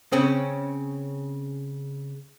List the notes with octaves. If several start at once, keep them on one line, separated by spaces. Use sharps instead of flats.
C#3 C4 C#4